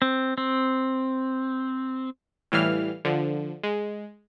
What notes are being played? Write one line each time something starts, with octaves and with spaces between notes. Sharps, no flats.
C4
C4
A2 E3 G3 F5 F6
D3 F3
G#3